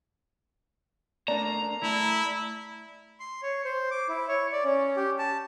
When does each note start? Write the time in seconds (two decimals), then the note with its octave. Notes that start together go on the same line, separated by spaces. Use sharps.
1.28 A3 A#3 D4 D5 A#5
1.83 A3 E4
3.20 C6
3.43 C#5
3.65 C5
3.91 D6
4.09 E4
4.28 C#5
4.52 D5
4.65 C#4
4.97 G4
5.19 A5